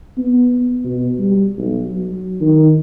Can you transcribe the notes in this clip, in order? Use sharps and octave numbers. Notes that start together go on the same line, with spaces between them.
B3
B2
G3
B1
F#3
D#3